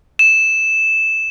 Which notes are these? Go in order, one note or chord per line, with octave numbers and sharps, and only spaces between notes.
E7